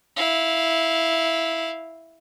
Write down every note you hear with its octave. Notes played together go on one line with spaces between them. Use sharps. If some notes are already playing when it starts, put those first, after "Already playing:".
E4 F5